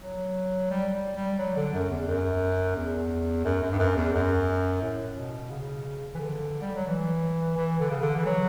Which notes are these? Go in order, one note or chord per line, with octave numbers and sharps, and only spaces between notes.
F#3
G3
G3
G3
F#3
D3
F#2
E2
F#2
E2
F#2
F#2
G2
F#2
E2
F#2
A2
B2
C#3
E3
D3
G3
F#3
E3
E3
D3
C#3
D3
E3
F#3